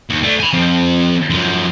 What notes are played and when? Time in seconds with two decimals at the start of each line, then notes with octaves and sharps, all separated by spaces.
0.10 D#2
0.23 A3 D4
0.40 G#5 B5
0.53 F3 C4
1.30 F#2 F3